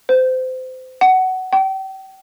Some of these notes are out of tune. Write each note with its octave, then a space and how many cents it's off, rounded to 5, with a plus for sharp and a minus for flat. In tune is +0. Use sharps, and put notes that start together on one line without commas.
C5 -30
F#5 +15
G5 -35